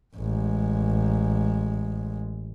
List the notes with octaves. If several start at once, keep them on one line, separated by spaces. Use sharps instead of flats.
A1 G#3